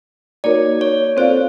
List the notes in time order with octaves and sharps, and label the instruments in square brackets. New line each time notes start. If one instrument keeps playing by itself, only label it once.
[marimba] A#3 D#4 F#4 A#4 C#5 [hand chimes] D5
[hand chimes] C#5
[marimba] C4 F4 A4 D5 F5 [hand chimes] C5